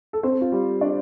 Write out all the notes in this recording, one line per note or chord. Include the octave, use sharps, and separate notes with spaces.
A4
C4 C5
F4
G3 G4
D4 D5